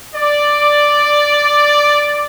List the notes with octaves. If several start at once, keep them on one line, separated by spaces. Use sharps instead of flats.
D5